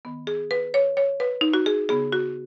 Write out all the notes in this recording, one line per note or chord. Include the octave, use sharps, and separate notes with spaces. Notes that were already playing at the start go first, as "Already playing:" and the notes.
D#3 B3
G#4
B4
C#5
C#5
B4
D#4
F#4
G#4
C#3 B3 G#4
F#4